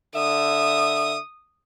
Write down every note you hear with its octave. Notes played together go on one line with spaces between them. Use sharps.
D3 E5 D#6